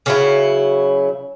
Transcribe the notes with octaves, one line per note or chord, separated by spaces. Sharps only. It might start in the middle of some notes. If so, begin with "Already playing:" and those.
C#3 F#3 E4